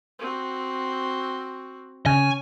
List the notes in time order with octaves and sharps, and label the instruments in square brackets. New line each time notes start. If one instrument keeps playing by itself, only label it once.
[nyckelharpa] C4 F#4
[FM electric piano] C#3 [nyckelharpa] C#5 [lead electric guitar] G#5